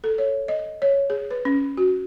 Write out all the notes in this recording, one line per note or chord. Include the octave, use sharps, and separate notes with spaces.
A4
C#5
D#5
C#5
G#4
B4
C#4
F#4